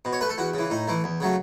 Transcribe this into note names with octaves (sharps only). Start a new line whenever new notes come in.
B2
C#5
A3 B4
A4
E2 F#4
C#3 E3
A2 D#4
E3 A3
E2
C#3 F#3 A3